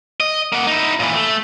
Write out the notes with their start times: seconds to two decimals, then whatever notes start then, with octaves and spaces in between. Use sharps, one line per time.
0.20 D#5
0.53 A#3 F#5
0.67 D#4 E4
1.00 A#2 E3
1.16 A3